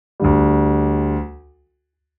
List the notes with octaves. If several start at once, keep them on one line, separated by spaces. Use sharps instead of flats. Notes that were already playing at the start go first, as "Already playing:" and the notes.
D2 D3 G3